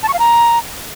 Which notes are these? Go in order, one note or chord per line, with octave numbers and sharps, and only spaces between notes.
A5
C#6
F5
A#5